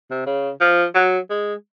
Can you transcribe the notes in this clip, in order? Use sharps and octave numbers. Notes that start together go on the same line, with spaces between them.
C3
C#3
F3
F#3
G#3